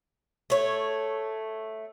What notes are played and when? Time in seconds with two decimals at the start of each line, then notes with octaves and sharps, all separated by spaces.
0.50 A3 C#5